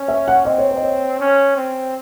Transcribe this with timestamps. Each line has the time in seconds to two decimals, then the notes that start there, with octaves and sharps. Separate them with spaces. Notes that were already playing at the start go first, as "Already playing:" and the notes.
Already playing: C#4
0.08 E5
0.28 F#5
0.45 C4 D#5
0.58 C#5
0.71 C5
0.76 D#5
0.83 C#5
1.20 C#4
1.56 C4